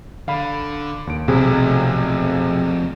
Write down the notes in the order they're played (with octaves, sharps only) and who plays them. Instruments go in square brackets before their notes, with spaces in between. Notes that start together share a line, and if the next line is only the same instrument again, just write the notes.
[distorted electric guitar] D3 [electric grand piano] F5 B5
[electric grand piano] D#2 D7
[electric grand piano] B1 C3 G#4 [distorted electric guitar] F2 E4
[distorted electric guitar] F2 A3